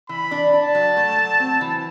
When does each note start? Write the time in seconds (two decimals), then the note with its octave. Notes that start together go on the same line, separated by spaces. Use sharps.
0.09 E3 B5
0.31 D4
0.53 D4 A5
0.75 F#3
0.97 A3
1.18 F#3
1.40 C4
1.61 E3